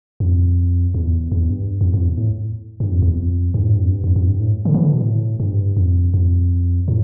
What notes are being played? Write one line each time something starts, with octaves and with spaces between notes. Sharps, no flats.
F2
E2
E2
G2
F2
F2
E2
A2
G2
F2
E2
F2
G2
A2
G2
F2
G2
F2
F2
G2
A2
D3
E3
D3
B2
A2
G2
F2
F2
A2